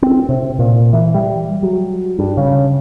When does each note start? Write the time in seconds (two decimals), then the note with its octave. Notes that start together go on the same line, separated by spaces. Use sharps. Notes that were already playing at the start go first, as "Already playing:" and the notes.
0.02 C4
0.29 C3
0.59 A#2
0.93 E3
1.14 G3
1.63 F#3
2.19 G2
2.37 C#3